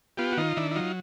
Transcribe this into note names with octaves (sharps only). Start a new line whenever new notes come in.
B3 F4 G4
F#4
D#3 D#4 F4
D#3 D4 E4
E4
F#3 D#4 F4